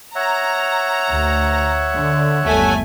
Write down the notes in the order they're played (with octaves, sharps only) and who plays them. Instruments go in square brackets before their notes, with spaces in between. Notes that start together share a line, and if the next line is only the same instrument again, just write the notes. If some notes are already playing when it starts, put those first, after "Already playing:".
[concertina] C#5 E5 F#5 [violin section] A#5
[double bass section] D2
D3
[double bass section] G1 D#2 [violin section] A3 G#5